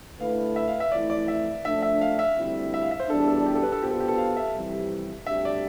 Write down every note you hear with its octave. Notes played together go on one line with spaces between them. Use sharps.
D3 A3 E4 B4 F5
E5
F5
E5
F2 E3 A3 E4 D5
D5
E5
F3 A3 D4 E5
E5
F5
E5
D2 D3 G3 C4 E4
E5
F5
E5
C5
E2 B2 G3 D4 A4
A4
G4
A4
B4
A4
B2 B3 D4 F4 G4 C5
A4
G4
A4
F5
E5
F2 C3 E3 G3
D2 C3 G3 D4 G4 E5
D5